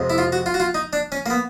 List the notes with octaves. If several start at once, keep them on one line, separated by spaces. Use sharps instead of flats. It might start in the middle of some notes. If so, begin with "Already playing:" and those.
Already playing: F2 C3 F3 G#3
E4
F4
F#4
F4
F#4
F4
D#4
D4
C#4
A#3
B3